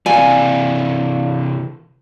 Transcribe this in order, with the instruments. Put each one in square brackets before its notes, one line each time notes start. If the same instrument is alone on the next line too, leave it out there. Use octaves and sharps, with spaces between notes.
[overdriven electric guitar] C3 E3 [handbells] D5 F5 [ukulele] G#5